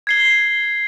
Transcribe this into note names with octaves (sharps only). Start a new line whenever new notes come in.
G#6 C7 G7